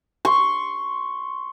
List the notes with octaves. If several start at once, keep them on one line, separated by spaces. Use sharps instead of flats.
C6 C#6